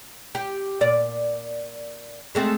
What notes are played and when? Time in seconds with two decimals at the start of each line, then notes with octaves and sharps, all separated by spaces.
0.35 G4
0.81 A#2 D5
2.35 G#3 A3 C4